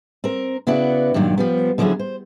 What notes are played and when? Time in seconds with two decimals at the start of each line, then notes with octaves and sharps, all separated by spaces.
0.24 C4 A#4
0.67 C#3 B3 E4 F#4 D5 F#5
1.14 G2 A#2 D#3 F#3
1.38 F3 G3 B3
1.78 D3 F3 F#3 C#4 E4 G#4
1.99 C5